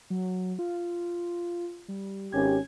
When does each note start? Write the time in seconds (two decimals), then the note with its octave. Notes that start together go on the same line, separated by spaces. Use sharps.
0.10 F#3
0.59 F4
1.88 G3
2.33 G#1 C#4 G4 G#6